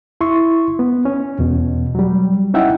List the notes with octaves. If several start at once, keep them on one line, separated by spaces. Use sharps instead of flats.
E4 E5 C6 C#6
B3
C#4
E2 B2
F#3 G3
C#4 D#4 E4 E5 F#5 G5